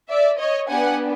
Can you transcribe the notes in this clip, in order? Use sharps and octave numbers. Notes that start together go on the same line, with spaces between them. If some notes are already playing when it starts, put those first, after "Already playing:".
D5 E5
C#5 D#5
B3 D4 G4 F#5 G#5